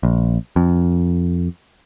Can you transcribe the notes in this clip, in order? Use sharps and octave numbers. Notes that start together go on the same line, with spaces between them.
A#1
F2